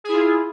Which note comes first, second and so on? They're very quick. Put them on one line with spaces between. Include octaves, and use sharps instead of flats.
G#4 E4 F4